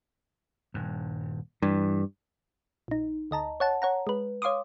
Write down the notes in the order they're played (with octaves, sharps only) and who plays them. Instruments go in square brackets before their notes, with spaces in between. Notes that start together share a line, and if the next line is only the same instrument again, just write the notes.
[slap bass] D#1 G2
[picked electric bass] G2 [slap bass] E3
[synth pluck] A#1 D#4
D2 D#5 A5 A#5
C#5 F#5 A5
C#5 F#5 A#5
G#3 B4
C#5 F5 C6 D6 D#6